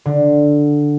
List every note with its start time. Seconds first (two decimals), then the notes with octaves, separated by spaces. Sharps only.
0.06 D3